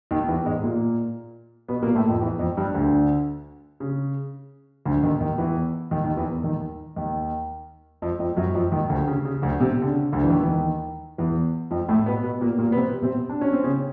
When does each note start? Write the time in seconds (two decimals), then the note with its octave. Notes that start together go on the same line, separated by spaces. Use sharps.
0.11 D#2 D#3
0.28 E2 E3
0.46 G#2 G#3
0.63 A#2 A#3
1.68 B2 B3
1.82 A#2 A#3
1.95 A2 A3
2.09 F2 F3
2.21 E2 E3
2.39 F2 F3
2.57 G2 G3
2.74 D2 D3
3.80 C#3
4.86 D2 D3
5.03 D#2 D#3
5.20 D#2 D#3
5.38 E2 E3
5.91 D#2 D#3
6.04 D#2 D#3
6.17 E2 E3
6.44 D#2 D#3
6.96 D#2 D#3
8.02 F2 F3
8.19 F2 F3
8.37 F#2 F#3
8.54 F2 F3
8.72 D#2 D#3
8.89 D2 D3
9.07 C#3
9.25 C#3
9.42 D2 D3
9.60 C3
9.82 D3
9.87 C#3
10.13 D2 D3
10.24 E3
10.30 D#2 D#3
10.42 E3
10.47 D#2 D#3
11.18 E2 E3
11.71 F2 F3
11.89 A2 A3
12.06 B2 B3
12.23 B2 B3
12.41 A#2 A#3
12.58 A#2 A#3
12.72 B3
12.76 C3 C4
13.02 C3 C4
13.29 D4
13.41 C#4
13.52 C4
13.64 C#3 C#4